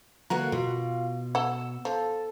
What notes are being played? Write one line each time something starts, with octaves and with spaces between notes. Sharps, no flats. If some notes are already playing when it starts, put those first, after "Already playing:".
D3 A#3 B3 F#4 A#4 F#5
B2 F4
A4 F#5 E6
F3 A4